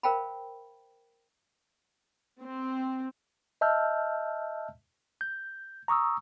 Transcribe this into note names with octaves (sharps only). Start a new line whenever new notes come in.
A#4 C5 F5 G5 A5 B5
C4
D#5 E5 A5 E6 F6 G6
G6
A#5 C#6 D#6 E6